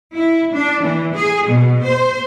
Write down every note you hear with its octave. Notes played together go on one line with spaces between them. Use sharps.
E4
D4
E3
G#4
B2
C5